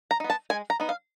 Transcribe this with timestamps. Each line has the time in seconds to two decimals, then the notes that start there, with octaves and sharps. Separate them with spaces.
0.11 A#5
0.20 B3 D#4
0.30 A5
0.50 G#3 G#5
0.70 A#5
0.80 B3 D#4
0.89 F5